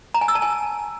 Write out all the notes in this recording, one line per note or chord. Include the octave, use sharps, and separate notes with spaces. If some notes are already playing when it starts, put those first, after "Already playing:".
A#5
G#5
E6
A5
G#5